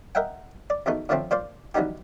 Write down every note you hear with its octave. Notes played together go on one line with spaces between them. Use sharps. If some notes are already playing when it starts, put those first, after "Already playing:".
A#4 D#5 E5 F#5 G5
D5
E2 B2 A3 D#4
A2 D3 F3 A3 C4
A#2 C5 D5 F5
B1 E3 G3 B3 D#4 G4